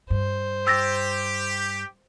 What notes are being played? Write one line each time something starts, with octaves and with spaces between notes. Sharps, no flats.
G2 C5
G4 E6 A6 A#6